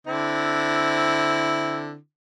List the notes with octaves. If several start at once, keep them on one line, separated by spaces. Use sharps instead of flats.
D3 C4 E4